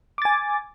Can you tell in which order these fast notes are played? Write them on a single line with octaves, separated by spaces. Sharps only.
D6 A6 G#5